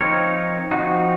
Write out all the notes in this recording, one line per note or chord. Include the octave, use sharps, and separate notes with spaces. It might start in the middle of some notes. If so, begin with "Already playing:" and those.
F3 C4 D#4 A#4 C#5
F3 C4 D#4 F#4